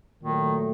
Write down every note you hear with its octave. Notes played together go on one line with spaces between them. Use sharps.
A#2 D#3 F#3 A3